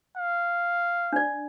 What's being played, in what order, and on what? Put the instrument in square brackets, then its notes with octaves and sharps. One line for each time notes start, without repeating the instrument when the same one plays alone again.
[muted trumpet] F5
[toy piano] D4 D5